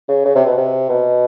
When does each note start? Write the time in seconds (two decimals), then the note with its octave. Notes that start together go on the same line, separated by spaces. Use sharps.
0.09 C#3
0.25 C#3
0.35 C3
0.46 B2
0.57 C3
0.89 B2